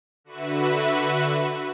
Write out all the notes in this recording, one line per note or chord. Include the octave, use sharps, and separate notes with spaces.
D3 F#4 B4 E5 B5